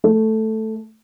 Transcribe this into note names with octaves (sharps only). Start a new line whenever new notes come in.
A3